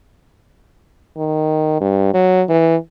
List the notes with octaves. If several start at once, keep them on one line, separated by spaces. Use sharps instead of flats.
D#3
G2
F#3
E3